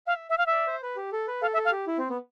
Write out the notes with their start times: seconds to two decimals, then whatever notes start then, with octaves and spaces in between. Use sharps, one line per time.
0.07 E5 F5
0.30 E5
0.38 F5
0.46 E5
0.52 D5
0.67 C5
0.83 B4
0.96 G4
1.12 A4
1.27 B4
1.42 A4 F5
1.53 E5
1.57 A4
1.65 F5
1.72 G4
1.87 E4
1.98 C4
2.10 B3